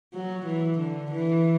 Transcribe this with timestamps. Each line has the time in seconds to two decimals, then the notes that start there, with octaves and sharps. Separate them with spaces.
0.14 F#3
0.46 E3
0.79 D3
1.11 E3